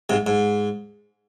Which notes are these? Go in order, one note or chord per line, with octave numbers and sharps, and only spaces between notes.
G#2 C3
G#2